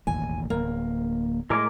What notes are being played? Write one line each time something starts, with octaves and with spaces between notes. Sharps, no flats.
E1 A1 D#2 G#5
D1 A#3
A2 G#3 A#4 D6